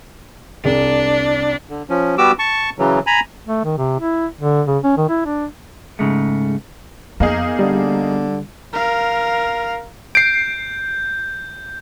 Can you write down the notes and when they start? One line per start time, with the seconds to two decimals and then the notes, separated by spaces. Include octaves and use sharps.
0.65 C2 D4 G#4
1.69 D3
1.90 F3 C#4
2.18 G3 B3 F#4 G4 D6 E6
2.39 A5 C#6
2.79 C#3 E3 F#3
3.07 G#5 A#5 B5
3.46 A3
3.64 D#3
3.78 C3
4.00 E4
4.41 D3
4.67 C#3
4.84 C#4
4.98 D#3
5.09 E4
5.25 D4
5.99 G#2 C#3 G#3 A3
7.20 F2 A#3 B3 D#4 G#4
7.59 D3 G3
8.73 A#4 F5
10.15 G6 C7 D7